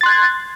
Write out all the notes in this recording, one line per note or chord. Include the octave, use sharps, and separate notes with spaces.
C6 F#6 G#6 A6